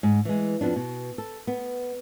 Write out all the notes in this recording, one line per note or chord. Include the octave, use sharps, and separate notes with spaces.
G#2
E3 G#3
F2 B3 D4
B2
A4
B3